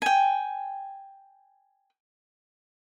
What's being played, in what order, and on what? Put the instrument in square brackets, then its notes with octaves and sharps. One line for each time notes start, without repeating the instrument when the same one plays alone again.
[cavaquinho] G5 G#5